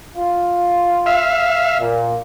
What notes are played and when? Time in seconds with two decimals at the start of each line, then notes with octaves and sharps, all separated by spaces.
0.16 F4
1.06 E5 F5
1.80 A#2